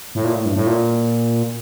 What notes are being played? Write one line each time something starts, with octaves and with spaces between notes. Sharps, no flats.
A2
A#2
A2
G2
A2
A#2